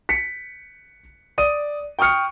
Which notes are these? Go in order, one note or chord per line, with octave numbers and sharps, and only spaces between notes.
B6 C#7
D5 D#6 D#7
G5 C#6 D#6 F6 C#7